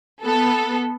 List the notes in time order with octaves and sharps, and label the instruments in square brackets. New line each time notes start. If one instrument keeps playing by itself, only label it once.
[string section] B3 A4